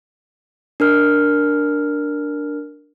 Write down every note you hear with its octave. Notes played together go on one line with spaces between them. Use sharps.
D4 A#4 F6